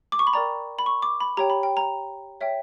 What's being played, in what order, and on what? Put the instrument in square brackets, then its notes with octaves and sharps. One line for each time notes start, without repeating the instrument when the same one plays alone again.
[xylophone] D6
C#6
B5
A#4 D5 G5 A#5
B5
C#6
D6
B5
G4 C#5 G5 A#5
B5
G5
A#5
C#5 E5 G5